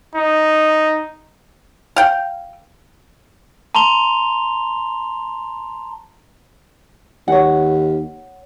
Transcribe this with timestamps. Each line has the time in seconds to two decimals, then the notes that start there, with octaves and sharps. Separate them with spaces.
0.15 D#4
1.96 F5 G5
3.75 A5 A#5 C6 F7 G7
7.28 D#2 C#5 F#5